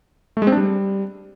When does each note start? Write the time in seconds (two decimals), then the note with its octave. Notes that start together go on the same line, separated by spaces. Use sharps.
0.37 A3
0.42 G#3
0.47 C4
0.52 D4
0.57 G3